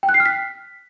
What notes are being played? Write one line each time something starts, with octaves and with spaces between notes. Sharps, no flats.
G5
F#6
C7
F6
B6